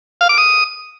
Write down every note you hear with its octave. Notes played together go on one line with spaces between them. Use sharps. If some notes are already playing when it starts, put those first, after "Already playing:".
F5
D6
D#6